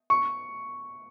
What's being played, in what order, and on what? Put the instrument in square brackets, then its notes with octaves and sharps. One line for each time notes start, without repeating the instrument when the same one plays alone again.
[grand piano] C#6